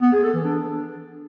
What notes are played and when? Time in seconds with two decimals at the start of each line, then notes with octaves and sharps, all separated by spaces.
0.02 B3
0.12 G#4
0.23 A4
0.34 E3
0.44 D4